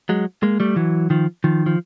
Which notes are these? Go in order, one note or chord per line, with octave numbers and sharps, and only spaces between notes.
F#3 G#3
G#3 A#3
G3 A3
E3 F#3
D#3 F3
D#3 F3
F3